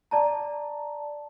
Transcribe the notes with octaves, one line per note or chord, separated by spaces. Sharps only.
D5 A5 A#5